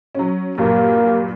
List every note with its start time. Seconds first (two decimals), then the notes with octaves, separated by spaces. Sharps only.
0.15 F#3 C#4
0.58 G2 A#2 F#3 A#3